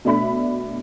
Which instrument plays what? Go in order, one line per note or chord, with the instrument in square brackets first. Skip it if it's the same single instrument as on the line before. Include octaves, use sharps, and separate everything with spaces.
[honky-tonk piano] B2 A3 D4 E5 B5